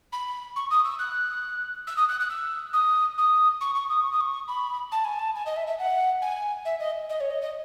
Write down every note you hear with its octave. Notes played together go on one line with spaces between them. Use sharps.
B5
C#6
D#6
E6
F#6
E6
D#6
F#6
F#6
E6
D#6
D#6
C#6
C#6
D#6
C#6
D#6
C#6
B5
A5
G#5
A5
G#5
D#5
E5
E5
F#5
G#5
E5
D#5
D#5
C#5
D#5
D#5